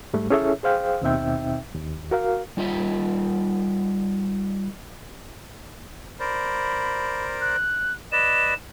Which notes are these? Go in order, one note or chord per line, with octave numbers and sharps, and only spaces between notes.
G#2 G3 A3
C#4 E4 G#4 A4 C#5 E5
G#4 C5 F5 G5
D#2 B2 C4 D#4 E5 G5
D#2
F#4 A#4 F5
G3 D#4 F4 D#5 E5
A#4 C5 D5 B5
F#6
B4 D5 D#5 E7